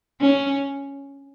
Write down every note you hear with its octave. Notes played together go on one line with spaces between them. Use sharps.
C#4